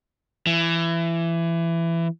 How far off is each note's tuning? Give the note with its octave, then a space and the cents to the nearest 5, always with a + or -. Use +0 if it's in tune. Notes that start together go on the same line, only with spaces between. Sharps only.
E3 +20